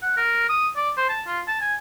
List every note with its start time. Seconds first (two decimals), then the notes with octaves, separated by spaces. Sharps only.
0.02 F#5
0.16 A#4
0.49 D#6
0.76 D5
0.97 C5
1.09 A5
1.26 F4
1.47 A5
1.61 G#5